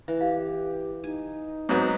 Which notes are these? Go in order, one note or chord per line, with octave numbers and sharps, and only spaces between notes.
E3 E5
G4 F5
D#4 G#5
G#2 F#3 B3 C#5 E5 A#5